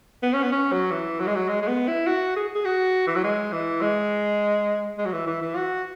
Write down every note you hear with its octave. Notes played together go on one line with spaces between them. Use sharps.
B3
C#4
B3
C#4
F#3
E3
F#3
G#3
F#3
G#3
G#3
B3
E4
F#4
G#4
G#4
F#4
E3
F#3
G#3
E3
G#3
G#3
F#3
E3
E3
E3
F#4